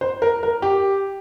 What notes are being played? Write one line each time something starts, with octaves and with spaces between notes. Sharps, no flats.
C5
A#4
A#4
G4